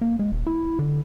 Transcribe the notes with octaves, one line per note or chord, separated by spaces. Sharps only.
A#3
G#3
D#1
E4
D3